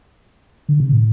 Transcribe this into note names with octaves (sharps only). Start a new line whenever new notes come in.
D3
C3
A2